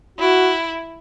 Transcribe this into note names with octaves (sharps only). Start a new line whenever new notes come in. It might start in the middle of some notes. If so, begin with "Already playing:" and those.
E4 F#4